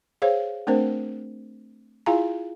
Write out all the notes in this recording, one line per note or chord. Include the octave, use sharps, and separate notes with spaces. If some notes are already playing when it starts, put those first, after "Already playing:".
G#4 C5 C#5 F5
A3 C4 D4 A#4 C5
E4 F4 G#4 F5 G#5 A#5